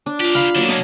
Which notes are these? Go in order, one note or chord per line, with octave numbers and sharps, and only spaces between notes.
D4
F4 G4 A#4
F5 B5
D#3 F#3 A#3 D4
F#2 G#3 A#4 D#5 A5